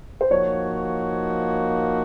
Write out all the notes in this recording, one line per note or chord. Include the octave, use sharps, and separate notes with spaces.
C5
F3 A#3 D#4 F#4 C#5